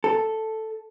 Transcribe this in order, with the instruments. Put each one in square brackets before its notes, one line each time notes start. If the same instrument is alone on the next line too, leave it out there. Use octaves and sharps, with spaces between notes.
[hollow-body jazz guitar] A4